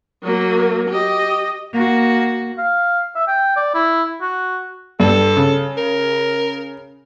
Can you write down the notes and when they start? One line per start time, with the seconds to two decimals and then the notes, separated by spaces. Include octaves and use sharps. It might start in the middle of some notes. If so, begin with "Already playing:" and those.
0.23 F#3 A#3
0.90 G4 D#5
1.73 A#3 F#4
2.58 F5
3.15 E5
3.28 G5
3.57 D5
3.74 E4
4.21 F#4
5.00 G2 A4
5.37 C#3
5.77 A#4